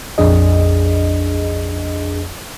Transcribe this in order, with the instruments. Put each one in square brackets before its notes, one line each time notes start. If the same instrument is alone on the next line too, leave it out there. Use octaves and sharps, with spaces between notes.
[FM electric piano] A#1 F2 D4 G#4 D#5